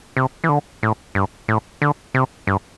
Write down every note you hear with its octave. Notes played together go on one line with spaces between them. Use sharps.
C3
E3
D3
A2
G2
A2
D3
C3
G2